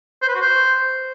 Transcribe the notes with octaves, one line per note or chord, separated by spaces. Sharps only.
C5
B4
F#4
C5